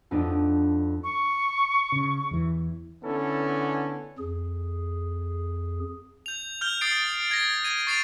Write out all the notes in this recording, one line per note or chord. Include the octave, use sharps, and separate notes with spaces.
F2 B3 D4 D#4
C#6
C#3
E2 E3
D3 B3 C#4 E4 A4
F2 G#4
G6 F7
F6 G6 G7
D#6 A6 C7 D7
G#6 A#6
G#6 D#7
C#6 A6 C7 D7 D#7 F7